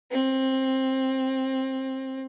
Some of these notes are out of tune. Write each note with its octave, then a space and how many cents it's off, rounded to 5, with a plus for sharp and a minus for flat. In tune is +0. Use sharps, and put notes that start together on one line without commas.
C4 +15